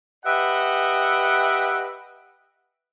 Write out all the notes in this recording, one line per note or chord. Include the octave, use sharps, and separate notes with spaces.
G4 B4 D#5 E5 F#5